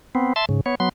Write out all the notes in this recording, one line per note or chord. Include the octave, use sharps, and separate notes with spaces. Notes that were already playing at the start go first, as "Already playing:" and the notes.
B3 C4
E5 A5 C6
G#2 C#3
B3 C#5
F#3 B3 C6